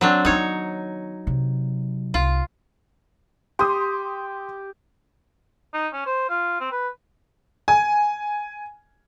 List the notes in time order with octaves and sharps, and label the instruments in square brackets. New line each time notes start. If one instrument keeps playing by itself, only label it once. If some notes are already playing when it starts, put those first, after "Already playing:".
[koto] F#3 C4 D4
[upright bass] D#3 B3 [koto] D#4 C#5
[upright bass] C3 F#3
[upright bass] C2 [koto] F4
[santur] G4 [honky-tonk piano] C6 D#6
[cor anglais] D#4
C#4
C5
F4
C4
B4
[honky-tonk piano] G#5